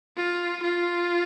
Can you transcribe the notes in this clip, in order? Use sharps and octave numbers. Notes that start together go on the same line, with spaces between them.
F4
F4